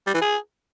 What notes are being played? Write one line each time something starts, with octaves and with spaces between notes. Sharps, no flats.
G3
E3
G#4